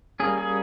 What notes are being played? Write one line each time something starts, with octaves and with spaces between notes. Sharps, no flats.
G3 A#3 C#4 G#4
G#4